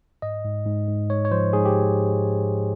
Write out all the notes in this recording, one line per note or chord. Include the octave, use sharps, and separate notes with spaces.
G#2 D#5
G#2
G#2
G#2
G#2 C#5
C#5
F3 C5
G#2 G#4
G4